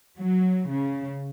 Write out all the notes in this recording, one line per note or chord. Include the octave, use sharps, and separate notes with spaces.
F#3
C#3